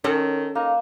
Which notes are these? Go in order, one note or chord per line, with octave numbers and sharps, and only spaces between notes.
D#3 C#4 A4
A#3 D#4